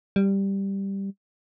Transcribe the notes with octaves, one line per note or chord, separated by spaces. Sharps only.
G3